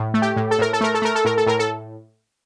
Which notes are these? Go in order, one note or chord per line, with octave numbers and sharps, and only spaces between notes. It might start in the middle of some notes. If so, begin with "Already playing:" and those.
Already playing: A2
A3
G4
A2
A4
A2 A#4
A4
A3 A#4
A4
A3 A#4
A4
A2 A#4
A4
A2 A#4
A4